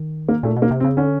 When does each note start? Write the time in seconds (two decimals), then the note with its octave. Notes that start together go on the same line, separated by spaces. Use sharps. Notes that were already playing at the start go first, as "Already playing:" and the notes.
Already playing: D#3
0.28 A#3
0.43 A#2 A3
0.57 B2
0.62 A#3
0.71 C3
0.80 C4
0.84 C#3
0.97 D3 C#4